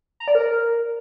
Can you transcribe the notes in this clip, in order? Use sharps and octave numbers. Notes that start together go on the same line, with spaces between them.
A#5
D5
A#4